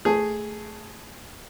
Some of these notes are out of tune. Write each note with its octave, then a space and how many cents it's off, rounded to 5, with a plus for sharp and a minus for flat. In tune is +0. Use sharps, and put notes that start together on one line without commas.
A3 +0 G#4 +0